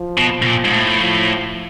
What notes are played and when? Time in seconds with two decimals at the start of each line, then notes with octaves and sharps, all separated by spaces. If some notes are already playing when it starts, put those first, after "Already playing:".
Already playing: F3
0.18 B2
0.42 B2
0.46 A#2
0.65 G#2
0.73 A2
1.01 F3